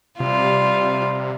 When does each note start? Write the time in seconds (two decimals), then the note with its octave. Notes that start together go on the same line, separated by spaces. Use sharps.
0.20 C3 G3 F4